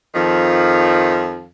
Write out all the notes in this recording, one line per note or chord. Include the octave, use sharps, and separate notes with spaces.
F2 D#3 F3